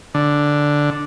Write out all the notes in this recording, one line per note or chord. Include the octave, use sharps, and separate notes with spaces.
D3